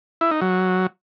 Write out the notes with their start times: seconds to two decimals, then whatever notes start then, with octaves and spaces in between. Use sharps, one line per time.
0.21 E4
0.31 D#4
0.41 F#3